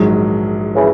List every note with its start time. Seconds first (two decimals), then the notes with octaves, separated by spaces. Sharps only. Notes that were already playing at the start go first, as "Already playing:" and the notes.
Already playing: A#1 G#2 D#3 F#3
0.75 C#3 E3